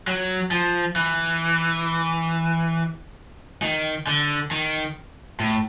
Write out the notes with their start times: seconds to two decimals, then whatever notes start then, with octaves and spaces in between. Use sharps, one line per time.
0.08 F#3
0.51 F3
0.96 E3
3.62 D#3
4.07 D3
4.51 D#3
5.40 A2